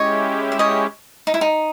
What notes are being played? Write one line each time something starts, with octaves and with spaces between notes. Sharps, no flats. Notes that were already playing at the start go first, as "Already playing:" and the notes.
Already playing: G#3 C#4 E4 G4 C#5 D#5
E5
C#5 D#5
D#4
E4
D#4